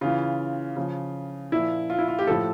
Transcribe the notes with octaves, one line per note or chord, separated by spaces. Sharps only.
C#3 E3 F4
C#3 F3
A#2 F3 E4
F4
E4
F4
G4
A2 F3 A4